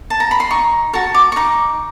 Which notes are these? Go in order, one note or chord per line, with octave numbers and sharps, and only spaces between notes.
A5
A#5
B5
C6
D#4 C#6
F#4 A4 C#6
D6
C#6
D#4 D6